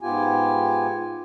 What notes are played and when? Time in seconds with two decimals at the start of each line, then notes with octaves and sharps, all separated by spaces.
0.01 G#2 B3 F4 G4 G#5